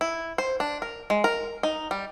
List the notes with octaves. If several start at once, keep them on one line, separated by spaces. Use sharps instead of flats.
E4
C5
D4
A#4
G#3
A#4
D#4
G3